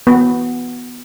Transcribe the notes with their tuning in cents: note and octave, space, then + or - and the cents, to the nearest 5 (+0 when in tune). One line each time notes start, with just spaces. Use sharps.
B3 -5